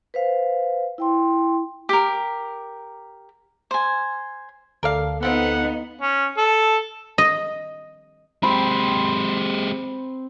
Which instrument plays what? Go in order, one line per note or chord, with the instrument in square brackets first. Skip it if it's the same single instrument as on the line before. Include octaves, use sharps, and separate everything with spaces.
[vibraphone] B4 C5 F5
E4 G5 C6
[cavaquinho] G4 A#4
C5 G#5
[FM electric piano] D2 A4 [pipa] A#4 D5 F5
[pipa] F3 C4 F4 [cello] B3 D#4 [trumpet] F#5
[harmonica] C#4
A4
[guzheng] D#5
[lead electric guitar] G#3 G4 [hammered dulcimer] C4 C5 B5